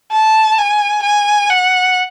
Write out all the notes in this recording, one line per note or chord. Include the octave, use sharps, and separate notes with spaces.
A5
G#5
G#5
F#5